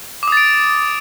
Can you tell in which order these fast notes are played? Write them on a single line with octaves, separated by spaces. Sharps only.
D6 D#6 A6 D7